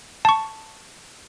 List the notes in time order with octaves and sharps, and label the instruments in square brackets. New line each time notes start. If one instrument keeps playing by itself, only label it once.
[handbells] A5 C#6